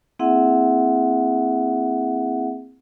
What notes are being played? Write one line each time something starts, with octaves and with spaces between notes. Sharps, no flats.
A#3 C4 E4 G#4 E5 F#5